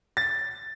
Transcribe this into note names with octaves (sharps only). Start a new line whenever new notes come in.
A6